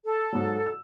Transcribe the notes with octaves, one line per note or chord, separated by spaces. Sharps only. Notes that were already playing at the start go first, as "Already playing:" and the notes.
A4
G#2 F#3
E6